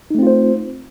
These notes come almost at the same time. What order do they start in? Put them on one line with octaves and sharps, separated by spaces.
D#4 A3 C4 F4 C5